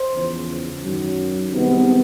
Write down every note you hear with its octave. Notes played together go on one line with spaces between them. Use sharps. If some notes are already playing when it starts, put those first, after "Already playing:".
Already playing: C5
E2 C#3 F3
F#2 D#3 F#3
C2 C3 D#3 G#3 B3